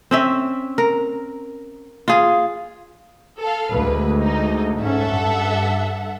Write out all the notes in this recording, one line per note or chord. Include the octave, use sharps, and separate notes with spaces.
C4 C#4 E5
A#4
F4 G#4
A4 F5
D2 G#3 B4
D#4
G#2 C#4 A4 E5 F#5
G2